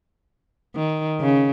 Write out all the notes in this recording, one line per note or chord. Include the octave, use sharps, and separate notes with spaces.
D#3
C#3